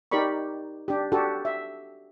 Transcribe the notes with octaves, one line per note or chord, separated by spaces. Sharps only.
D#4 G4 A#4 D5 B5 C#6
D4 G4
D4 F#4 G4 A4
E5